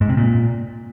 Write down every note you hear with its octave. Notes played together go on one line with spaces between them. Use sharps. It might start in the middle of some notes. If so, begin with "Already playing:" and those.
G#2
C3
A#2